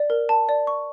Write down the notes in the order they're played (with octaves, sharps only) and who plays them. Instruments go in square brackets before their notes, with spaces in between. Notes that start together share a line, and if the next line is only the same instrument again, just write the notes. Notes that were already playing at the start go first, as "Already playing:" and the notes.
Already playing: [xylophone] D5
A#4
A5
D5
C#6